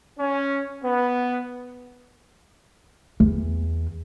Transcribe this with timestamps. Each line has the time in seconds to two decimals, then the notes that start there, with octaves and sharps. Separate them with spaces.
0.19 C#4
0.83 B3
3.20 E2